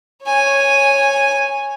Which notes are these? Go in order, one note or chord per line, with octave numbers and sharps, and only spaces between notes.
C#5 G#5